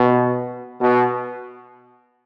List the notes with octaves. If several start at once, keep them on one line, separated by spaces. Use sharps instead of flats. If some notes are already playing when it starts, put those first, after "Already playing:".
Already playing: B2
B2